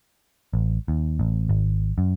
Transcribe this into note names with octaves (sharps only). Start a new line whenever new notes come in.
A1
D#2
A1
G#1
F#2